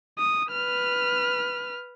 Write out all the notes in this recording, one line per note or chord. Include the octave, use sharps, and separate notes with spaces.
D#6
B4 F6